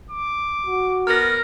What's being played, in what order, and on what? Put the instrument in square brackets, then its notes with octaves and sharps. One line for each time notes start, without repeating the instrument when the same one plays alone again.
[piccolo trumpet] D6
[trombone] F#4
[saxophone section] B3 A#4 [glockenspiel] F6 A#6